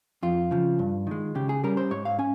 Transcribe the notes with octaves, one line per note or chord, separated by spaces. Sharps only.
F2 F4
C#3 F3
G2
D#3 G#3
C#3 G4
G#4
G3 C#4 A#4
C5
G#2 C#5
F5
C#4 G#5